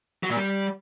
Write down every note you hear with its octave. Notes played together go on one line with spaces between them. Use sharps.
F#3
A#2
G3